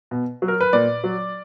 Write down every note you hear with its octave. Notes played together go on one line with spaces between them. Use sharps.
B2
F#3
A#4
B4
A#2 D5
F#3